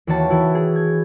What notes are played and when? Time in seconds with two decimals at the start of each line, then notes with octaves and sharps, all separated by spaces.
0.07 D#2 E3 F#4 C#5 A5
0.30 E3 E4 F#4
0.55 G#4
0.76 G#6